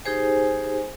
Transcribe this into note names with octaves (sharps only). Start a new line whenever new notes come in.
D#4 G4 G#4 C5 G#5